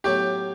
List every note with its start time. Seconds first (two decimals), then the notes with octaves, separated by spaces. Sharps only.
0.04 A2 F#3 B3 D#4 F#4 G4